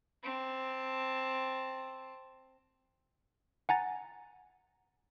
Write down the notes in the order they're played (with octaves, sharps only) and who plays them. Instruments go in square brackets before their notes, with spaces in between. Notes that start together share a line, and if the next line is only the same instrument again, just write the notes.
[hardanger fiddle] C4 A5
[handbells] F#5 G#5 A#5 A6